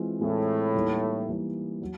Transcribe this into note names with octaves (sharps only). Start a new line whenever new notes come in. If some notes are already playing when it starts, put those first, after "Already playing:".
Already playing: E3 G#3 C4 F4
A2 E3 G#3 C4 F4
E3 G3 A#3 D#4
E3 G3 A#3 D#4
F#3